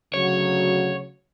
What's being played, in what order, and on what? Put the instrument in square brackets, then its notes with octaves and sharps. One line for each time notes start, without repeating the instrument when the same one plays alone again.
[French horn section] D2 C#3 F#3 [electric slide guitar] C#5